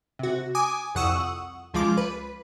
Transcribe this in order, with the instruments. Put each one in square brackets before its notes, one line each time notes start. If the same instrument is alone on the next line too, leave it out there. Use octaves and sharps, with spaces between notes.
[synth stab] C3 F#4
G#5 D6 D#6
C2 F2 F#5 C#6 D#6 E6
C#2 F3 G#3 F4 D6
B4